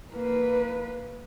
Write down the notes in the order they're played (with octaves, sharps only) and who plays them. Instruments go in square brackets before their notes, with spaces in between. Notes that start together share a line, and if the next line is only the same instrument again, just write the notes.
[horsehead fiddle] A#3 B4